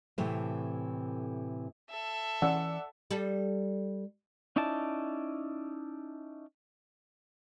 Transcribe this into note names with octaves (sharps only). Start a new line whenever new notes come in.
A2 C3 E3 A3
A4 E5
E3 C#4 D5 F#5 E6
G3 A4
C#4 D#4 E4 D5 A5